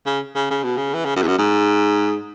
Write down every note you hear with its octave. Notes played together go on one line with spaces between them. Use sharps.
C#3
C#3
C#3
B2
C#3
E3
C#3
F#2
E2
F#2
G#2